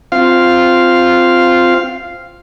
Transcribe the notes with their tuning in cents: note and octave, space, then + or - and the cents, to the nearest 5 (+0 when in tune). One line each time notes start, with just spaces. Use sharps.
C4 -5 F4 +0 F5 -5